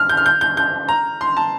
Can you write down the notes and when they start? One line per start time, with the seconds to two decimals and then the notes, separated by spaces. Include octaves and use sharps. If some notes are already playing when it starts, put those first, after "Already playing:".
Already playing: F6
0.09 G6
0.17 F6
0.26 G6
0.41 G6
0.57 G6
0.89 A#5
1.21 C6
1.37 A5